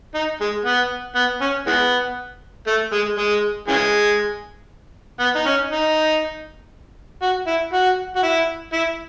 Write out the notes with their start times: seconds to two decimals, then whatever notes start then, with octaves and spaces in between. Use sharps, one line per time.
0.14 D#4
0.41 G#3
0.65 B3
1.16 B3
1.41 C#4
1.66 E3 G#3 B3
2.67 A3
2.92 G#3
3.18 G#3
3.68 C#3 E3 G#3
5.20 B3
5.35 D#4
5.46 C#4
5.71 D#4
7.22 F#4
7.47 E4
7.73 F#4
8.16 F#4
8.23 E4
8.73 E4